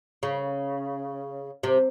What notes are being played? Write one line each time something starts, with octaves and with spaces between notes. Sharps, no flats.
C#3
C3